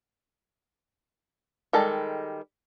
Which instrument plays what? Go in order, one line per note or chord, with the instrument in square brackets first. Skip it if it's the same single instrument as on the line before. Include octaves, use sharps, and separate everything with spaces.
[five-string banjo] D#3 G3 G#3 A4